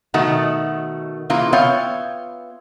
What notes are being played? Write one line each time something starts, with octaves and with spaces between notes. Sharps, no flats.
B2 D#3 A3 F#4 F#5
C#3 E3 A#3 F4
B3 F4 C#5 E5 F5 G5